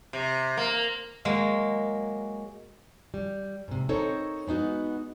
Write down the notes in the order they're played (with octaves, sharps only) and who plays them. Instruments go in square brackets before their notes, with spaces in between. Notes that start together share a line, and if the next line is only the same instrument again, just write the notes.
[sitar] C3
A#3
[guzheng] F#3 G#3 A#3
[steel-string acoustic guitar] G3
G#2 C3
C4 D#4 A4 A#4 C5 C#5
G#3 B3 D#4 F#4